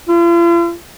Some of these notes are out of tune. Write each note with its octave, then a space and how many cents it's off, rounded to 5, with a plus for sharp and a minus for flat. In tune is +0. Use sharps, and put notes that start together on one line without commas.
F4 -45